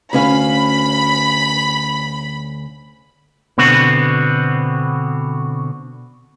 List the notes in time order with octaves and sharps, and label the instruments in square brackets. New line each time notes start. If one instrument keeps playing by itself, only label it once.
[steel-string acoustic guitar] D2 C#4 F5 [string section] B5
[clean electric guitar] B2 D3 B3 C4 F#4